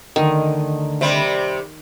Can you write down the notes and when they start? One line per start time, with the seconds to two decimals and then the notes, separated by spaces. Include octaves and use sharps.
0.16 D2 D3 D#3 D#5
1.01 C3 G3